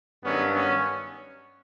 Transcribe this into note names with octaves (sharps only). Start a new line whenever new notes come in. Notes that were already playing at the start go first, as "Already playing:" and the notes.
G2 D#3 F#3 B3 C#4
B3 C#4